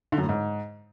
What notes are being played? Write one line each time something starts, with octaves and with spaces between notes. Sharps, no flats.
D3
F#2
A2
G#2